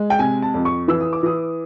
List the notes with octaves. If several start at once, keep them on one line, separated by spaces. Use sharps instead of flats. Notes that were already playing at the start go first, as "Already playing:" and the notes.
Already playing: G#3
G5
C3 G#5
A5
F2
C#6
E3 E6
D#6
D6
E3 D#6